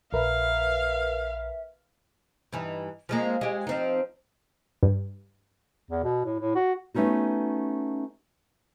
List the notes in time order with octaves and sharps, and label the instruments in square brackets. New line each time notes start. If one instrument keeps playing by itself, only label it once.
[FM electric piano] A#1 A#4 B4 [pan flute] E5 [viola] F5
[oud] G2 E3 D#4
F3 G#3 A#3
G#3 G4
F3 C4 D#4
[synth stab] G2
[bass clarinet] E2
B2
A2
A2
F#4
[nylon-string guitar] A3 B3 C#4 D#4 F#4